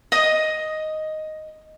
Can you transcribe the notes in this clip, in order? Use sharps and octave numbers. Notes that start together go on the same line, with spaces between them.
D#5 D#6